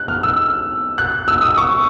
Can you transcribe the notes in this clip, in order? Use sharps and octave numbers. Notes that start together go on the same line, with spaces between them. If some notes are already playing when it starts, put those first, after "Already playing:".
Already playing: F#6
F6
E6
F#6
E6
D#6
C#6